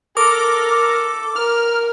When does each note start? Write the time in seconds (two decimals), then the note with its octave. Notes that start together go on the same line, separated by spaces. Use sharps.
0.17 A4 A#4 D6
1.36 A#4 F6